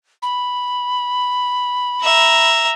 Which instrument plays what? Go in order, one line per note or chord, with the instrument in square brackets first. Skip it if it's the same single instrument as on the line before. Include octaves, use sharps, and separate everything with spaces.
[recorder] B5
[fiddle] E5 A#5